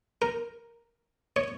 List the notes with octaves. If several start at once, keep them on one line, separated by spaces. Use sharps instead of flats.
A#4
C#5